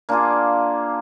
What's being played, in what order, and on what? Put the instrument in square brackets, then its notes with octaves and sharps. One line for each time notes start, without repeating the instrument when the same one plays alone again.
[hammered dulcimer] A#3 D4 F4 G#4